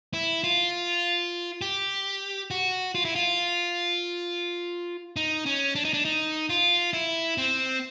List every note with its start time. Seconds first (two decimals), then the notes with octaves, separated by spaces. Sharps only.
0.13 E4
0.44 F4
1.61 G4
2.50 F#4
2.95 F4
3.05 E4
3.15 F4
5.16 D#4
5.46 C#4
5.75 D4
5.85 D#4
5.94 D4
6.05 D#4
6.49 F4
6.93 E4
7.38 C4